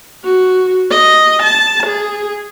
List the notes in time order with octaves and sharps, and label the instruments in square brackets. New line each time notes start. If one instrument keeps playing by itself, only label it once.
[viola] F#4
D#5
A5
G#4